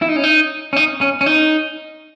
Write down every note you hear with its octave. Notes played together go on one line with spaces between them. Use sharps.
E4
D#4
C#4
D#4
C#4
D#4
C#4
C#4
D#4